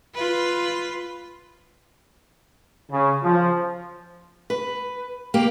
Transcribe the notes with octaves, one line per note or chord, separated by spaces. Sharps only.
F4 B4
C#3
F3
B4
A#3 G4